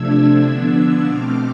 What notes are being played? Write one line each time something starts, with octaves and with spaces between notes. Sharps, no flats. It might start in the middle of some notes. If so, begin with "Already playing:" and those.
Already playing: C3 F3 A3 D4 E6 G#6
D3 F3 B3 D4
B2 A3 C4 D6 F6